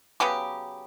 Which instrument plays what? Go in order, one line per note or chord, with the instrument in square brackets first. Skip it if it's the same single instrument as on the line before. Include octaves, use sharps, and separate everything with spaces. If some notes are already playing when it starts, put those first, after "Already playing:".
[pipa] C#3 F#3 B3 G4